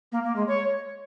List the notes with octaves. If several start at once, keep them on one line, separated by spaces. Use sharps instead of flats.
A#3
A#3
G#3
C#5